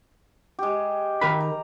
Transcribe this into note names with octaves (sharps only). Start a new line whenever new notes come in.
G#3 G4
D#3 A#4 B5
A#5